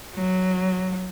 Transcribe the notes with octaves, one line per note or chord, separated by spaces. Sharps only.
F#3